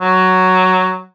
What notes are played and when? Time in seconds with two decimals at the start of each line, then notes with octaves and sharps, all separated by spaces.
0.01 F#3